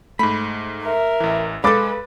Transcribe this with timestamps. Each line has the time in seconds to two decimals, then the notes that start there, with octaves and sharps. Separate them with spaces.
0.19 G#2 A3 B5
0.84 A#4 E5
1.20 A1 E3
1.64 G#3 A4 B4 F5 B5 D6 A6